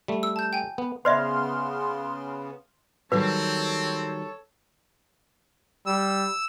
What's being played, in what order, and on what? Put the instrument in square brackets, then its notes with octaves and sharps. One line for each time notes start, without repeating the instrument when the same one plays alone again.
[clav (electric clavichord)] G3 A3
[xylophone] E6
A5 G6
G5 G#5
[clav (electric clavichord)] B3
[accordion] C#3 B3 [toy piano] C5 D5 E5 [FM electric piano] C6 F6
[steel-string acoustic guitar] D#3 F#3 G3 [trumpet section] C4 [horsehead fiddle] A4 C#5 [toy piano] B4
[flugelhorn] G3 [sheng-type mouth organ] E6